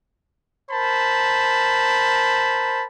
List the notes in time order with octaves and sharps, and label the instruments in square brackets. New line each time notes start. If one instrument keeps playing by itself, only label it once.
[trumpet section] A#4 C5 A5 B5